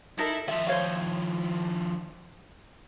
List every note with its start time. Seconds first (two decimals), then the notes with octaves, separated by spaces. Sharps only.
0.19 D#4 E4 A4 A#4 E5
0.48 D#3 F3 E5
0.67 C5 C#5 F5